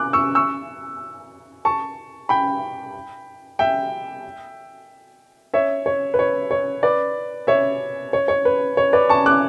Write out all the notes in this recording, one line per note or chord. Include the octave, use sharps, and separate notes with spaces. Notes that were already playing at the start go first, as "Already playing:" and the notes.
Already playing: D6 F#6
C#6 E6
C#6 E6
A5 C#6
G5 B5
E5 G5
C#5 E5
C#5
B4
C#5
C#5
B4 D5
C#5 E5
C#5
C#5
B4
C#5
B4 D5
A5 C#6
D6 F#6